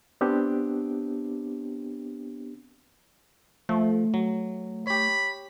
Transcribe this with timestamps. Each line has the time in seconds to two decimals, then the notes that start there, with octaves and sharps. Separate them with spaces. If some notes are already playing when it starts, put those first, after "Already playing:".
0.21 B3 C4 D4 G4
3.69 F3 A3
4.14 F#3
4.87 G4 C#5 B5